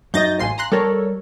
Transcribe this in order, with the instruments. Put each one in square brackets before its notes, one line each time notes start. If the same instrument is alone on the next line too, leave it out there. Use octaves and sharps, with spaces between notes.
[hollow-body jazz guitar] F#2 D#4 D#5 [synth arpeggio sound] G6 A6 A#6
[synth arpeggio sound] A1 C6 C7 [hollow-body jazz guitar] F5 F#5 G#5
[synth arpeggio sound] A#5 C6 F#6
[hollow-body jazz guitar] G3 A#4 [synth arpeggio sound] A4 C#5